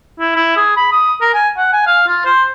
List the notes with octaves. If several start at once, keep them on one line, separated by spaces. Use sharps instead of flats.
E4
E4
G#4
B5
D#6
A#4
G#5
F#5
G#5
F5
F4
C5